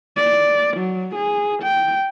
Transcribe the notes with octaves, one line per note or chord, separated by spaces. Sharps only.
D5
F#3
G#4
G5